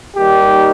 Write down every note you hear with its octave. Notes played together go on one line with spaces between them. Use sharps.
D#2 D#3 G3 G4